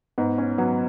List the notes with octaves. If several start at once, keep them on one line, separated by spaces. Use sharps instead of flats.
G#2 B3
C#4
F#3 B3